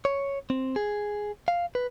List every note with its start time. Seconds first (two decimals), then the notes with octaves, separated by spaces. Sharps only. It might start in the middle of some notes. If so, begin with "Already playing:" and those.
0.05 C#5
0.50 C4
0.76 G#4
1.48 F5
1.75 B4